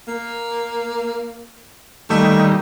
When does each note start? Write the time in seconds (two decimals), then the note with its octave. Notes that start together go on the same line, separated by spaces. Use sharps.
0.08 A#3
2.10 D#3 G3 A3 A#3